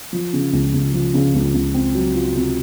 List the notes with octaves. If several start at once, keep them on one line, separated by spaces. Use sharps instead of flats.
F3
C#3
C#2
C#2
F3
C#3
C#2
C#2
C4
F#3
F4
C3